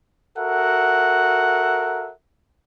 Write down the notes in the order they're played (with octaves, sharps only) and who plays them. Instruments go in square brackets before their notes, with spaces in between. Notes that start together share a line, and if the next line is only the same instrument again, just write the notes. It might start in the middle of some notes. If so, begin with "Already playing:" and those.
[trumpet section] F#4 A4 A#4 E5 F#5